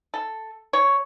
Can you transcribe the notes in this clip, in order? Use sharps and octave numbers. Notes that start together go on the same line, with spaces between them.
A4
C#5